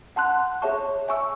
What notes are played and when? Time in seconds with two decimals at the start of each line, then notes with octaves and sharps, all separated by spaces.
0.16 F#5 A5 C6 F#6
0.62 G#4 C#5 E5 A5 C#6
1.08 E5 G#5 C#6 E6